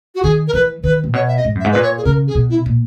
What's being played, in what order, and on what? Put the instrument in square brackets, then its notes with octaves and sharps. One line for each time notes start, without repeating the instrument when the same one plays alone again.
[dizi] F#4
[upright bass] D#3 [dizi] G#4
[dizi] A#4
[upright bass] E3 [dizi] B4
[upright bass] D#3 [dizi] B4
[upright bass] A#2
[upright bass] B2 [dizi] C#5
[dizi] E5
D#5
[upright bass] G#2
F#2
[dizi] E5
[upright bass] G#2
[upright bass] A#2 [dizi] B4
[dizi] C#5
G#4
[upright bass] C#3 [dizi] A#4
[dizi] G#4
[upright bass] B2
[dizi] E4
[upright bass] A#2